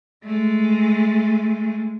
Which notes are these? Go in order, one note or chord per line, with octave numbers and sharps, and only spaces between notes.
G#3 A3